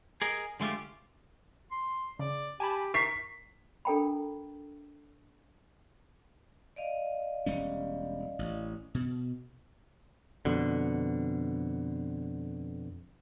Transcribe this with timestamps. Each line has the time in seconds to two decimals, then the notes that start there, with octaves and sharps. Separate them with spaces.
0.22 G#4 A#4 D#5
0.60 D3 G#3 A3 F4 G4
1.72 C6
2.19 C#3 D5
2.60 G4 G#5 A5 B5
2.94 A#4 C#6 B6 C7
3.85 D4 A4 A#4 G5 A#5 B5
6.76 D5 D#5 F5
7.46 E1 G3 C#4
8.39 A1
8.95 B2
10.45 F2 B2 D3